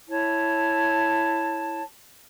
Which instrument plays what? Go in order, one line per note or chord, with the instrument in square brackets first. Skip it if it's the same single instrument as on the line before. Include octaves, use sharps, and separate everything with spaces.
[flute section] E4 C#5 A5